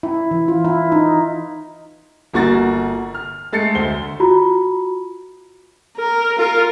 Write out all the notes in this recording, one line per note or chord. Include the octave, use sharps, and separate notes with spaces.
E4
E3
F4
E4
D#4
G1 A#3 F#4 C#6 A6
F6
G#3 A3 A6 C7 C#7
D2 C5 G7
F4 F#4 A#5 B5
A#4
F4 A#4